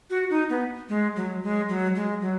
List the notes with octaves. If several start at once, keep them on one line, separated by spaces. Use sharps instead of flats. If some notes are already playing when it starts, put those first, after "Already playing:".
F#4
D#4
B3
G#3
F#3
G#3
F#3
G#3
F#3